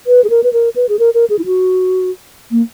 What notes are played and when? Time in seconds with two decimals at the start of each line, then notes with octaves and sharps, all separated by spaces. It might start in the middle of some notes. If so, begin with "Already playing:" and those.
0.07 B4
0.24 G#4
0.30 A#4
0.43 B4
0.53 A#4
0.76 B4
0.89 G#4
0.99 A#4
1.14 A#4
1.30 G#4
1.39 E4
1.46 F#4
2.51 A#3